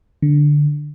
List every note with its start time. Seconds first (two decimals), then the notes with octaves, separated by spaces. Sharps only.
0.22 D3